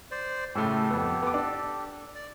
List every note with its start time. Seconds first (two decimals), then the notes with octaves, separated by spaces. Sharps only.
0.11 C5 D5
0.55 A2 C#3 A3 G4 A4
0.90 F2 B3
1.22 B3 D6
1.34 D4
2.15 D5